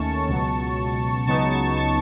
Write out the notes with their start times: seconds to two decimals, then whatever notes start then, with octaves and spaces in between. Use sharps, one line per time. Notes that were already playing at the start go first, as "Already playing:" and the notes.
Already playing: D#2 D#3 A3 C#4 A5 C#6
0.28 C#2 B2 F#3
1.27 C#2 C#3 F#3 B3 D#4 A5 C#6
1.51 A5 C#6
1.76 A5 C#6